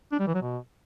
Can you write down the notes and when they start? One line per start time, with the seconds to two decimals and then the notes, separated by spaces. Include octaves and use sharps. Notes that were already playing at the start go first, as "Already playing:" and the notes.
0.12 D4
0.20 G3
0.27 E3
0.35 F#3
0.42 B2